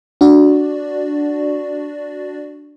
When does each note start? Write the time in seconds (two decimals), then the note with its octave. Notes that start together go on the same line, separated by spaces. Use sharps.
0.21 D4 F#4 D5